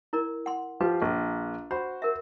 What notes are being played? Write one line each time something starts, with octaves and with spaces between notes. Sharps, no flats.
E4 A#4 D5
F#5 C6
F3 F4 G4 B4
A#1 A#3
F#4 C5 B5
A#4 E5